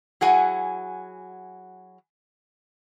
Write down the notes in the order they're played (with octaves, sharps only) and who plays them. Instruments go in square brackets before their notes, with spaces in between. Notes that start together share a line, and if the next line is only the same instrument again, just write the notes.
[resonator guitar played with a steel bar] F#3 E4 F#4 G#4 F#5 G#5